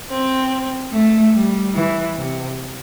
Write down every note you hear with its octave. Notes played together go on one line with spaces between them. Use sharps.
C4
A3
G3
E3
C3